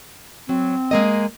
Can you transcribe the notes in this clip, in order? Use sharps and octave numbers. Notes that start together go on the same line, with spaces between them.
F#3 C4
G#3 A#3 D#5